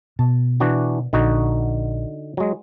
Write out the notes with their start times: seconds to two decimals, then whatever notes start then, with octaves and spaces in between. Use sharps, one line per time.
0.19 B2 A5
0.60 E3 D4 F#4
1.13 A#1 D3 D#4 F#4
2.37 F#3 G#3